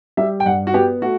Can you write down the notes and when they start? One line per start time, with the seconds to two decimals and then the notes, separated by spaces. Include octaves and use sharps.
0.17 G3 E5
0.40 G5
0.46 G2 F#5
0.67 F#4
0.74 B3 G4
1.02 A3 F#4